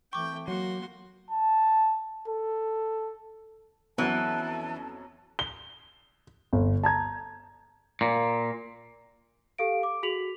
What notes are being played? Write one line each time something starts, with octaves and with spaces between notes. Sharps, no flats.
E3 A3 C4 G5 C#6 D6
F#3 A#3 F#4 C6
A5
A4
F2 E3 F#3 B3 C#4 F#5 A5
G7
G1
A5 A#5 G#6
A#2
G4 A4 F5 D7
D6
F#4 G#4 B6 F7 F#7